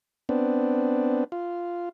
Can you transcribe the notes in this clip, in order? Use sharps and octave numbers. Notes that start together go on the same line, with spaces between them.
B3 C4 D4
F4